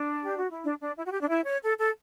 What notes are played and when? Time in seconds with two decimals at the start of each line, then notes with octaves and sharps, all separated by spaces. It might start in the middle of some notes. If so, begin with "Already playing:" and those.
Already playing: D4
0.23 G4
0.36 F#4
0.50 E4
0.63 D4
0.80 D4
0.96 E4
1.05 F#4
1.12 G4
1.21 D4
1.29 E4
1.45 C#5
1.63 A4
1.78 A4